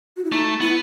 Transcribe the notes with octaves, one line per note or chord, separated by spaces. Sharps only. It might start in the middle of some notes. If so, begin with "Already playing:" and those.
F#4
E4
A3 D#4
B3 E4